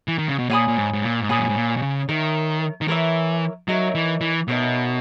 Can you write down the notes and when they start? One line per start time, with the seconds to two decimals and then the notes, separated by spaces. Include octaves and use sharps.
0.08 E3
0.19 D#3
0.28 C#3
0.39 B2
0.50 A#2 C#5 G#5 B5 D#6
0.68 A#2
0.77 G#2
0.93 G#2
1.03 A#2
1.21 G#2
1.29 A#2 C#5 G#5 B5 D#6
1.39 F#2
1.47 G#2
1.56 A#2
1.77 B2
1.82 C#3
2.09 D#3 A#4 C#5 E5
2.81 D#3
2.88 E3 A#4 C#5 E5
3.68 F#3 D#4 A#4 C#5 E5
3.95 E3
4.21 E3
4.48 B2 D#4 A#4 C#5 E5